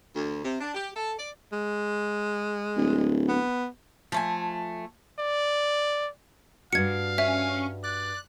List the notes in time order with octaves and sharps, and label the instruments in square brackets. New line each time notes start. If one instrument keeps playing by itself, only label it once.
[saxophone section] D2
C3
D4
G4
A4
D5
[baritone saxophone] G#3
[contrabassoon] D1
[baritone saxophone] B3
[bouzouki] F3 A3 G#5
[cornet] D5
[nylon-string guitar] G2 D4 F#4 [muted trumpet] F5 [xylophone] G#6 C#7
[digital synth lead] C#4 [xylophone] E5
[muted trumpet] D5 [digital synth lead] F#6